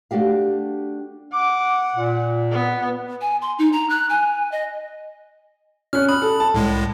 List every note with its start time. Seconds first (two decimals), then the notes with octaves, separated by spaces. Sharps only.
0.11 A3 D4 F#4 G4 F5
1.33 F#5 D6
1.95 A#2
2.51 B3
3.21 G#5
3.42 C6
3.59 D#4
3.72 A#5
3.90 F#6
4.10 G#5
4.52 D#5
5.93 C#4 F6 F#6
6.09 B5 D#6
6.22 A4
6.40 A5
6.54 C2 A2 G#3